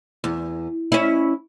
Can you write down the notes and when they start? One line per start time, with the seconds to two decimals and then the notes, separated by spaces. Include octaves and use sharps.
0.24 E2
0.92 C#4 E4